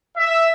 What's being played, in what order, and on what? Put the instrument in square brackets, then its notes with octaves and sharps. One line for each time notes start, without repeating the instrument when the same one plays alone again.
[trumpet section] E5